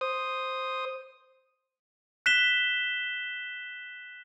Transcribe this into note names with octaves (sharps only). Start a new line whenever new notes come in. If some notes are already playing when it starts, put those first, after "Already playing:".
C5 D#6
F#6 B6 E7 G7